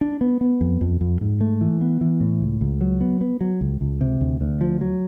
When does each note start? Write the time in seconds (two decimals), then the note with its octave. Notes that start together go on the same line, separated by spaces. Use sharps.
0.01 D4
0.21 B3
0.41 B3
0.61 F2
0.81 F2
1.01 F2
1.21 G#2
1.41 A3
1.61 E3
1.81 B3
2.01 E3
2.21 A2
2.41 C#2
2.61 C#2
2.81 F#3
3.01 B3
3.21 B3
3.41 F#3
3.61 C#2
3.81 C#2
4.01 C3
4.21 D2
4.41 D2
4.61 F3
4.81 F#3